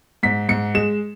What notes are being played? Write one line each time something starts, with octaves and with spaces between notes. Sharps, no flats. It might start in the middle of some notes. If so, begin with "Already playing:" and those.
G#2 B6
G#2 C#7
G#3 E7